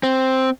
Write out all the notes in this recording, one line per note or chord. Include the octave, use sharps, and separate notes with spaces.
C4